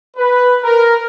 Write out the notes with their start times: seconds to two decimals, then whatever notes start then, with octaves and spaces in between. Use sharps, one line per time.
0.17 B4
0.63 A#4